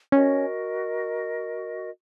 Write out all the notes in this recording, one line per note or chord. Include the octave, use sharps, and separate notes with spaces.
C#4 F#4 A#4 D#5